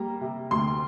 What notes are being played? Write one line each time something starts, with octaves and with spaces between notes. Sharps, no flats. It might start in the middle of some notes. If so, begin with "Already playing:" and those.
Already playing: G3 A#3 A#5
C3
D2 C6